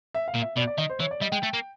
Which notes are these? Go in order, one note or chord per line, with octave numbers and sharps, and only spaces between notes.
E5
F5
A#2
E5
B2 D5
D5
D#3 D#5
C5
E3 C#5
D5
G3 D#5
G#3 G5
A3
A#3